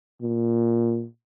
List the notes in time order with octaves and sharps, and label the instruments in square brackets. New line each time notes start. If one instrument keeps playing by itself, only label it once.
[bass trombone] A#2